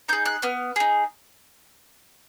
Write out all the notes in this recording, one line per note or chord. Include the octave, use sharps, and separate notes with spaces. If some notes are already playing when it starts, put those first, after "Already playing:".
D#4 G#4 G6
F#6
B3 F6
D#4 G#4